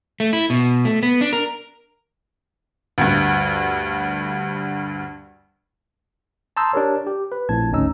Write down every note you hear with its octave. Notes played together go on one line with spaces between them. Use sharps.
A3
E4
B2
A3
B3
D4
A#4
D2 G2
A5 A#5 C6 D#6 E6 G6
D4 G4 A#4 C#5
G4
B4
A#1 A2 C4 A5 G#6
G#1 D2 C#4 D#4 E6